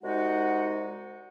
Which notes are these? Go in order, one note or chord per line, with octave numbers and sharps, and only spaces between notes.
C2 G#3 D#4 F#4 F#5